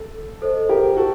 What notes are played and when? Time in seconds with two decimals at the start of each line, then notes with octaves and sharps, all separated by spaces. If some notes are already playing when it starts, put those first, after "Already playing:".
Already playing: A4
0.42 A4 C5 D#5
0.69 G4 A#4
0.97 F#4 A4